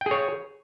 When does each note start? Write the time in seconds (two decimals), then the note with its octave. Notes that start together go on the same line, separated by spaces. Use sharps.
0.01 G5
0.06 G#4
0.11 C#5